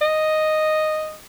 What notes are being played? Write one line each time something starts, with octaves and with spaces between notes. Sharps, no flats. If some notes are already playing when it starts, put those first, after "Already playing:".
D#5